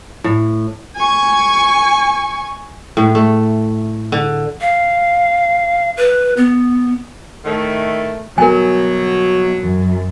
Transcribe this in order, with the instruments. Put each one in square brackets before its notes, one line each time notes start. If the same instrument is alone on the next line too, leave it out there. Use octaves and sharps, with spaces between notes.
[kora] A2
[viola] G#5 C#6
[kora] A2
A3
D3
[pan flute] F5
B4
B3
[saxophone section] A2 D#3 A3
[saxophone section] B2 F#3 [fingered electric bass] G3 B3 [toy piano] A#4 G#5
[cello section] F#2